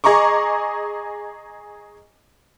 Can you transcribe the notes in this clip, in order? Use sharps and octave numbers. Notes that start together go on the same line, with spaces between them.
G#4 D#5 A#5 C#6 D6